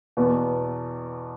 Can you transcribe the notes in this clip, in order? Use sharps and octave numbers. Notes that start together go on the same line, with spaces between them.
E2 B2 B3